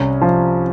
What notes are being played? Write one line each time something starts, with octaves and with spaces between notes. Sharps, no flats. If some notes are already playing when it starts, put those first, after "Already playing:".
Already playing: C2 C#4
F3